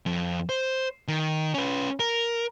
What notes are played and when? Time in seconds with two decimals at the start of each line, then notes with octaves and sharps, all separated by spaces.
0.06 F2
0.49 C5
1.08 D#3
1.54 C#4 B4
2.00 A#4